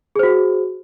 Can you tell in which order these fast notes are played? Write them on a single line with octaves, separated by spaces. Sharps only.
G#4 C5 F#4